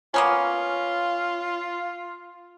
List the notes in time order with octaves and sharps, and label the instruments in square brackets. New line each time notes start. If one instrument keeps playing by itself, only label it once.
[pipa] A#3 B3 C#4 [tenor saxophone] F4